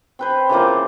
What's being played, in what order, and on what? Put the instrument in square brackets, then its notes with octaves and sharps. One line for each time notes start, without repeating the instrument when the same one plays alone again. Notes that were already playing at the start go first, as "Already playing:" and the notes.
[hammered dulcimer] C4 B4 C5
C#3 E3 F3 A#3